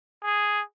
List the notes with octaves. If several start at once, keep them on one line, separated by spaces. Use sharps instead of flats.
G#4